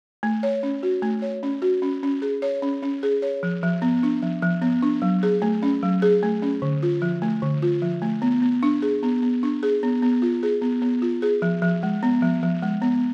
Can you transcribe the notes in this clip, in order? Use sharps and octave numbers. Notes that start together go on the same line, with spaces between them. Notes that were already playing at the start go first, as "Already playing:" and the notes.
A3
C#5
C#4
F#4
A3
C#5
C#4
F#4
C#4
C#4
G#4
C#5
C#4
C#4
G#4
C#5
F3
F3
B3
D4
F3
F3
B3
D4
F#3
G#4
A3
C#4
F#3
G#4
A3
C#4
D3
F4
F3
A3
D3
F4
F3
A3
B3
B3
D4
G#4
B3
B3
D4
G#4
B3
B3
F4
G#4
B3
B3
F4
G#4
F3
F3
G#3
B3
F3
F3
G#3
B3